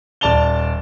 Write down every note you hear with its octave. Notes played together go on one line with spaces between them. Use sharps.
D#1 D5 A5 F7 G7